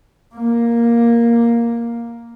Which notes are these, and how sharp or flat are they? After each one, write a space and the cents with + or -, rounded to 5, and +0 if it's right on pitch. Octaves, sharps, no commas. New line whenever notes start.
A#3 +5